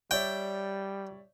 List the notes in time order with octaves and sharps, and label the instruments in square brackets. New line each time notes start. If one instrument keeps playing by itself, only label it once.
[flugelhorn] G3 [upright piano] C#5 D5 E5 [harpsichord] G5